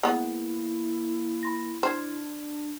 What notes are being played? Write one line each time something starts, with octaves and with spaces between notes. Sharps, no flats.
G#3 A#3 B3 E4
B5 C6 A#6
D4 C5 C6 F6 G#6